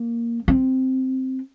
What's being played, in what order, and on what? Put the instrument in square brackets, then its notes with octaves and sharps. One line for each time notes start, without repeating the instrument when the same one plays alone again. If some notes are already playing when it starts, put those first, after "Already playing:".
Already playing: [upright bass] A#3
C4